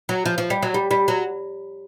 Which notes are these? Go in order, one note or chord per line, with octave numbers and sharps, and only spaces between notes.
F#3
F3
F3
G3
F#3
G3
G3
F#3